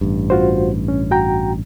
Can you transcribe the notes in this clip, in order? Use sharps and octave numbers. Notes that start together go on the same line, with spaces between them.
A1 G2
F4 F#4 C5
C#4
F#4 G5 A#5